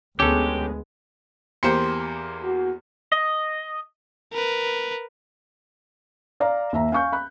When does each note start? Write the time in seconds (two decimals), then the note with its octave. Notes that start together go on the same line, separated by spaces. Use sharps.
0.20 D2 G#3 B3 C#4 G4 A4
1.63 E2 A#3 G4 C5 C6 C#7
2.44 F#4
3.12 D#5
4.33 A#4 B4
6.40 D5 F5 A#5
6.73 D#2 E5 A#5
6.92 F5 G#5 C#6 G6
7.12 B5 F#6